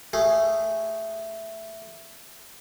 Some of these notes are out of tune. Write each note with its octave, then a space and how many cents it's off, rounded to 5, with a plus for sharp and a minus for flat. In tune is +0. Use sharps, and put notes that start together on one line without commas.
A3 +5 G#4 -5